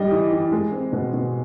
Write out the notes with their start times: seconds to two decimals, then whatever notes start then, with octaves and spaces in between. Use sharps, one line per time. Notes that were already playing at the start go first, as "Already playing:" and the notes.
Already playing: G3 D4 D#5
0.11 E3
0.31 E3
0.52 G#3
0.72 C4
0.93 B2
1.14 B2